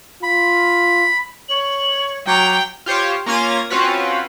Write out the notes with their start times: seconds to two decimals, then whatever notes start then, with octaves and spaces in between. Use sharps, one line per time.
0.23 F4 B5
1.48 C#5 F#7
2.27 F#3 G5 A#5 D6
2.86 F4 G4 C5 C#5
3.26 A#3 C#4 F4 G#6 A#6
3.70 C4 C#4 F4 F#4 B4